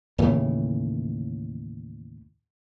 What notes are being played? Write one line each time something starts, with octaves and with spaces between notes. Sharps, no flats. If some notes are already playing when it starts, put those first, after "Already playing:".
D#2 A2 C#3 E3